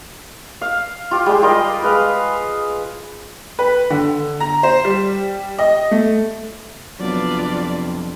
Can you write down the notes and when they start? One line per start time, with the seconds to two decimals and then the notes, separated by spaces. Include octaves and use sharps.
0.61 F5
1.11 F4 G4
1.26 G3 G#3 G4
1.42 G3 F4 A#4 D#5
1.82 G#3 B4 F5
3.59 B4
3.90 D3
4.40 A#5
4.63 C5
4.85 G3
5.59 D#5
5.91 A3
7.00 F2 C3 F#3 B3 D4 F4 B4 D5